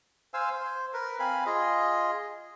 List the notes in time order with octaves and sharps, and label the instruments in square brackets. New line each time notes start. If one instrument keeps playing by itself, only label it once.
[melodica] C5 F5 G#5 E6
C5
A#4 B4
C4 F5 G#5 B5
F4 G#4 D#5